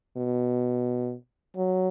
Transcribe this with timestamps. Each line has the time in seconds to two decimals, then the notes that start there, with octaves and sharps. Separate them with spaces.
0.17 B2
1.56 F#3